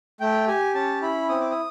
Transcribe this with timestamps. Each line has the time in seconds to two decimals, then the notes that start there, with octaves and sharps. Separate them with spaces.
0.20 A3 G5
0.48 G4 G#5
0.74 C#4 A5
1.02 E4 B5
1.29 C4 D#6
1.41 D6
1.51 D#6